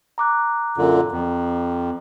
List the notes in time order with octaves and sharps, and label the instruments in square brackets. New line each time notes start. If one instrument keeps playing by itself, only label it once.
[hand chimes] A#5 D6 F#6
[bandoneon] F#2 A#2 D3
F2